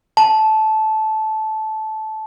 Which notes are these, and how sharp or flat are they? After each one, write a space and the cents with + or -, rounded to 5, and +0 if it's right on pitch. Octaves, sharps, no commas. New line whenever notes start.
A5 -15